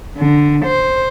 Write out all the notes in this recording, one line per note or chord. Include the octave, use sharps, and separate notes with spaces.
D3
C5